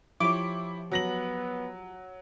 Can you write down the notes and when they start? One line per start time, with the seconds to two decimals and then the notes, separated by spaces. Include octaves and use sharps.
0.20 F3 E4 G4 C#5 D6
0.91 F#3 B3 A#6 F#7